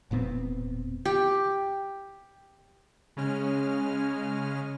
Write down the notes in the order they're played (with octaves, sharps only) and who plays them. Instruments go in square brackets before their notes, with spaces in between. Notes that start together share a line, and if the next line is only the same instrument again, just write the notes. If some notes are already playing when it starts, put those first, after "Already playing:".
[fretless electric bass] E1 A#2 B3 C4
[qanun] G4
[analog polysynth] C#3 G#3 C#4 F6